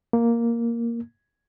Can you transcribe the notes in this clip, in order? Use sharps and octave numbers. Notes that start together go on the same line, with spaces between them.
A#3